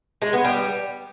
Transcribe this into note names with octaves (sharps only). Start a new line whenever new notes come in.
G#3
B3
G3